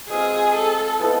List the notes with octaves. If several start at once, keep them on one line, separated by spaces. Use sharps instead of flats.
G#3 C4 F4 G#4
A4
F3 G#3 B3 E4